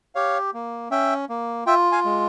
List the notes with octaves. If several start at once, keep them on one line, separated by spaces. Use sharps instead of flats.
G4 C#5 F5
A#3
C#4 E5 G5
A#3
F4 E5 G5
F5 G#5
G#3